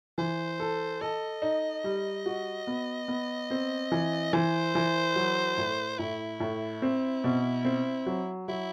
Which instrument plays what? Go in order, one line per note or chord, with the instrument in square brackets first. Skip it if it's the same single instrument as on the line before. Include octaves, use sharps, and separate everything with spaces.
[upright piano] E3 [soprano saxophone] C5
[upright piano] A4
[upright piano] A4 [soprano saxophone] D#5
[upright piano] D#4
G3
F#4
B3
B3
C4
E3
[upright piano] E3 [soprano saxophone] C5
[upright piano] E3
F#3
A2
[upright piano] A2 [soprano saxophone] E4
[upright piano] A2
C4
B2
C4
F#3
[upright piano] F#3 [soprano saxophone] E4